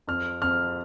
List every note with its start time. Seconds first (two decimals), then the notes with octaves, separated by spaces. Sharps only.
0.07 F2 F6
0.41 F2 F6